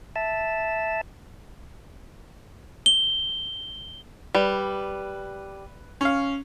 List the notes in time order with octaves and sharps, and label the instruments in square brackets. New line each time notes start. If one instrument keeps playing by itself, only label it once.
[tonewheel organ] E5 A5
[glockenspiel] G7
[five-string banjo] G3 [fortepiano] B4
[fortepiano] C#4 F5